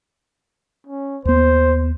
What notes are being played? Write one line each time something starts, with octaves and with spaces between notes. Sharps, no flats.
C#4
D#2 B3 C5